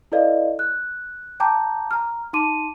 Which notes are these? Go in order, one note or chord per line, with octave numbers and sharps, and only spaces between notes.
E4 A4 B4 D5 D#5 F5
F#6
G5 A5 A#5 D6 G6
A#5 F6
D#4 A5 C6 D6 D#7